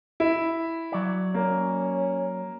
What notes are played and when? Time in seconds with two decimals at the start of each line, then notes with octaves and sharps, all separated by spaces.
0.20 E4
0.92 F#3 D5
1.34 A#3 C#4